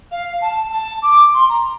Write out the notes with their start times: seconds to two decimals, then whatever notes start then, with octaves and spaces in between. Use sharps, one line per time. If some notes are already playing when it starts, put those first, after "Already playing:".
0.11 F5
0.41 A5
0.72 A5
1.02 D6
1.34 C6
1.49 A#5